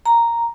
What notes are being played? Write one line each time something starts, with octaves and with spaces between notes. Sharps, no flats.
A#5